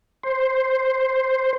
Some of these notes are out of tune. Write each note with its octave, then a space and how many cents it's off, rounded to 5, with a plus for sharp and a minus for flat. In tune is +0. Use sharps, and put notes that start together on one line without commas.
C5 +5